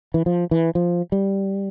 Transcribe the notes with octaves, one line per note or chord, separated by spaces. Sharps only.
E3
F3
E3
F3
G3